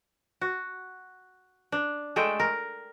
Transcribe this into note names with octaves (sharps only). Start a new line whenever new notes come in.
F#4
D4
G#3 A3 A4 G5
A#4